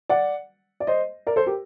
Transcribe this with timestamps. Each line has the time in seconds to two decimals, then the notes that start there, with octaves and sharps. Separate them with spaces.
0.09 D5 F#5
0.80 D5
0.87 C5 D#5
1.27 A#4 D5
1.36 A4 C5
1.46 G4 A#4